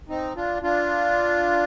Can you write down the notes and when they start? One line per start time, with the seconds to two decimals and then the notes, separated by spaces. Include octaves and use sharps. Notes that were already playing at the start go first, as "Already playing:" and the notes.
0.09 C4 D#4
0.36 D4 F4
0.62 D4 F4